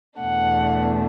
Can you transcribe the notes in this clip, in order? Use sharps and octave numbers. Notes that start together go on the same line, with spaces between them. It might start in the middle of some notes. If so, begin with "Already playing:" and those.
E2 B2 A3 D4 F#5